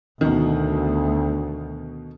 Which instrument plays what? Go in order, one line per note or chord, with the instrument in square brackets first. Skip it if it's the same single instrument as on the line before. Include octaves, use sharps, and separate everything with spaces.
[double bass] D2 [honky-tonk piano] B2 D#3